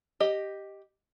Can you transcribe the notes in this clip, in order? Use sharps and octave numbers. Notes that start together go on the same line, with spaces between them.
G4 D#5